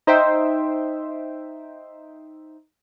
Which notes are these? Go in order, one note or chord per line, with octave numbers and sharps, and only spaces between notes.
D#4 C5 E5 G5